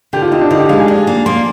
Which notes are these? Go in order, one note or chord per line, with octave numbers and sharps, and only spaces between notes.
D3 G4
F4
C4 D#4
D4
D3 D#4
G4
G#3 F5
G#5
D4
A#3
A#3 C6